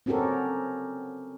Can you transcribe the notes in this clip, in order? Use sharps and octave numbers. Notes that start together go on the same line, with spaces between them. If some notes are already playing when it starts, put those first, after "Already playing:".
C4 C#4 F#4 G4 A4 A#4